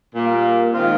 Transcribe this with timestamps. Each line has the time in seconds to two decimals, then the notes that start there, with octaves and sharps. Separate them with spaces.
0.15 A#2 G3 A#3
0.73 D#3 G#3 C4 F4